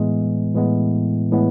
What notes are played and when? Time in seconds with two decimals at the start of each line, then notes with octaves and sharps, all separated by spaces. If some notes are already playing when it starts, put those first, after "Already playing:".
Already playing: A2 E3 G#3 B3
0.54 A2 E3 G#3 B3
1.32 A2 E3 G#3 B3